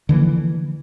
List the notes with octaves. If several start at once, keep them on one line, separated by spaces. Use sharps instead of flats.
D3 E3 F3 A#3